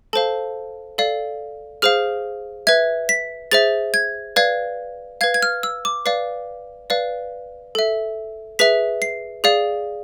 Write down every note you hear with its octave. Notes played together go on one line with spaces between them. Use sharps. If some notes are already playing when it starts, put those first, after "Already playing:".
A4 C5 F5 A5
A4 D5 F5
G#4 C5 F5 F6
B4 E5 G#6
B6
G#4 C5 E5 A6
G#6
B4 D5 F5 G#6
B4 F5 G#6
G#6
F6
E6
D6
B4 D5 F5 C7
B4 D5 F5
A4 E5
G#4 B4 E5 B6
C7
G#4 D5 F5